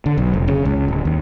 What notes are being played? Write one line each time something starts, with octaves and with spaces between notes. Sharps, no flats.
D3
B1
F1
C#3
C#2
D1
D#2